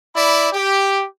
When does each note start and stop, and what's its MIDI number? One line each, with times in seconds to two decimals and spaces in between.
0.16 0.48 64
0.16 0.48 74
0.16 0.48 83
0.52 1.04 67